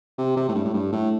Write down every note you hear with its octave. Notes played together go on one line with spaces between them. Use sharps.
C3
C3
A2
G2
A2
G2
A2